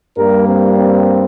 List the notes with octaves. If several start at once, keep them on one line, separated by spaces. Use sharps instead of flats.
G2 G3 A#3 A#4
C4
C4